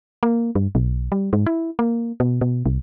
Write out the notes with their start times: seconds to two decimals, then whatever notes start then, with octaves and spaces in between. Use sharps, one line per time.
0.23 A#3
0.55 G2
0.75 B1
1.12 G3
1.33 G#2
1.46 E4
1.79 A#3
2.20 B2
2.41 B2
2.66 C2